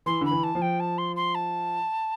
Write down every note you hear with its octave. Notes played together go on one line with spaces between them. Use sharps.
E3 C6
D3 B5
E3
A5
F3
G5
A5
C6
C6
A5